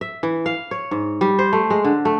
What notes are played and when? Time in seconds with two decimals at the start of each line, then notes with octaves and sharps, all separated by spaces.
0.01 E5
0.23 E3
0.46 F5
0.71 C#5
0.91 G#2
1.21 G3
1.39 C5
1.53 A3
1.70 G#3
1.84 D3
2.05 A3